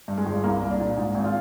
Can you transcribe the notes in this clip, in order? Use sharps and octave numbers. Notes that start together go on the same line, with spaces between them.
G2
G#3
G1
C2 A#3
C2
D4
A#2
G#2
G#1
F4